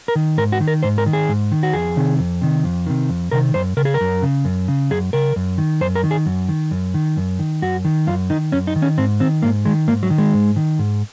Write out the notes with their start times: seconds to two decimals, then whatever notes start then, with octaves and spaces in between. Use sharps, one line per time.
0.08 A#4
0.16 D#3
0.38 G#2 A#4
0.52 F#4
0.60 D#3
0.68 A#4
0.83 G#2 C5
0.98 A#4
1.06 D#3
1.13 G#4
1.29 G#2
1.52 D#3
1.63 F#4
1.73 F2 G#4
1.96 C3 D#3
2.19 F2
2.41 C3 D#3
2.64 F2
2.86 C3 D#3
3.10 F2
3.31 C3 D#3 A#4
3.54 F#2 C5
3.77 C#3 A#4
3.85 G#4
3.94 A#4
4.01 F#2
4.23 C#3
4.45 F#2
4.68 C#3
4.90 F#2 G#4
5.13 C#3 A#4
5.36 F#2
5.58 D#3
5.81 F#2 C5
5.95 A#4
6.03 D#3
6.11 G#4
6.26 F#2
6.49 D#3
6.71 F#2
6.94 D#3
7.17 F#2
7.39 D#3
7.62 F#2 F#4
7.85 D#3
8.07 F#2 F4
8.30 D#3 D#4
8.52 F#2 C#4
8.67 D#4
8.76 D#3
8.82 C#4
8.98 G#2 C4
9.20 D#3 C4
9.42 G#2 A#3
9.65 D#3 G#3
9.88 G#2 A#3
10.03 F#3
10.10 D#3
10.18 G#3
10.34 G#2
10.56 D#3
10.79 G#2